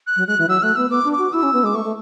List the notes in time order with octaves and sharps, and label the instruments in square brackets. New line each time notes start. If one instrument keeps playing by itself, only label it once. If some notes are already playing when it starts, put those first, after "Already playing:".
[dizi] F#6
[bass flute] F#3
[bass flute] G#3 [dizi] F#6
[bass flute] E3
[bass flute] F#3 [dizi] E6
[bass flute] A3 [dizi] F#6
[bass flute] B3 [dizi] E6
[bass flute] B3 [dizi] D6
[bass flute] D4
[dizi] D6
[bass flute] F#4
[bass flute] E4 [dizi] E6
[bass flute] C#4
B3
[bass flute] G#3 [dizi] D6
[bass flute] A3 [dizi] C#6
[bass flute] A3